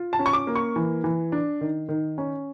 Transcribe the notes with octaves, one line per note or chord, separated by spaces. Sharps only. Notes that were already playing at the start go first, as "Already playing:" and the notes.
Already playing: F4
A5
C#4
C#6
D6
A#3
C#6
E3
E3
D4
D#3
D#3
C#4